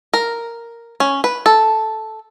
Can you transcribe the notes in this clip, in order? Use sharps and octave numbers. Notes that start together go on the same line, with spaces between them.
A#4
C#4
B4
A4